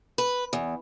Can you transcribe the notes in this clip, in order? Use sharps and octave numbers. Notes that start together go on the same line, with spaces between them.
B4
E2